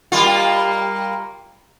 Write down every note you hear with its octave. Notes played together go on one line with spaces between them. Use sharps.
G3 A#3 F4